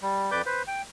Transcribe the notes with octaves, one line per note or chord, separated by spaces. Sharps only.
G3
F2 B4 D5 D6 G6
B4 C5
G5